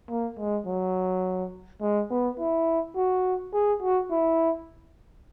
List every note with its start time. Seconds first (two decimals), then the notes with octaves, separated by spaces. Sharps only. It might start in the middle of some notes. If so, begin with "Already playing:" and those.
0.10 A#3
0.38 G#3
0.66 F#3
1.81 G#3
2.11 B3
2.39 E4
2.96 F#4
3.53 G#4
3.82 F#4
4.11 E4